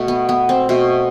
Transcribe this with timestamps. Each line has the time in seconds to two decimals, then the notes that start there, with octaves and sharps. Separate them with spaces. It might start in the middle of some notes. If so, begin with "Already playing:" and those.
Already playing: B2 A3
0.08 B3
0.29 B3
0.49 C4
0.69 B2 A3